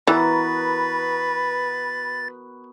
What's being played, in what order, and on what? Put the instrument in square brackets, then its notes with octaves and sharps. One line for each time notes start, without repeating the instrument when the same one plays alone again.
[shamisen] E3 [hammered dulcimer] B3 F#4 A#4 [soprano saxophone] B4 [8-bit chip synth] A6